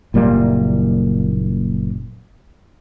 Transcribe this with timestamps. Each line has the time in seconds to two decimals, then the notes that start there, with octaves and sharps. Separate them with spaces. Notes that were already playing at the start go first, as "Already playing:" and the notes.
0.14 F#1 A#2 G3 A#3